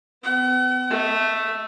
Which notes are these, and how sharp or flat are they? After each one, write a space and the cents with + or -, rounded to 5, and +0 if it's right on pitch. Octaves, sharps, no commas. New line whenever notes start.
B3 +40 F#5 +40
A3 +0 D#5 +40